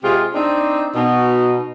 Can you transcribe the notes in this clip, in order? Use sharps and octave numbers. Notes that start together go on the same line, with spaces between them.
C3 G#3 C4 F4 G4 G#4
C4 D4 D#4
B2 D#4